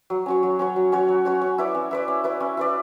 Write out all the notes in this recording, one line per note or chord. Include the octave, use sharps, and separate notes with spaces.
F#3
C#4 F#4 C#5
F#3
C#4 F#4 C#5
F#3
C#4 F#4 C#5
F#3
C#4 F#4 C#5
C#4
E4 B4 D5
C#4
E4 B4 D5
C#4
E4 B4 D5
C#4
E4 B4 D5